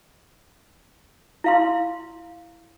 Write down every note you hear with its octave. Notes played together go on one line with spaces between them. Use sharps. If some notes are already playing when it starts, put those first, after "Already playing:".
E4 F5 C6